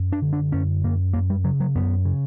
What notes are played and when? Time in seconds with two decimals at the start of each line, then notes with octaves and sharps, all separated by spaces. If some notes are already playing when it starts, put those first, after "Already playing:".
Already playing: F#2
0.12 D4
0.22 D3
0.33 D4
0.52 F#2 C#4
0.84 F#2 A#3
1.13 F#2 A#3
1.30 G3
1.44 C#3 F#3
1.60 F#3
1.75 F#2 B3
2.05 C#3